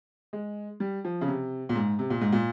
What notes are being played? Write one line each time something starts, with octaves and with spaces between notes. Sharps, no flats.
G#3
G3
F3
C#3
C3
A#2
G#2
C3
A#2
G#2
A#2